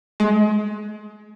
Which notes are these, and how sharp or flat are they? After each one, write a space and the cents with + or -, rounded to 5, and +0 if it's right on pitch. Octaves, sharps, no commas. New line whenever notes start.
G#3 +30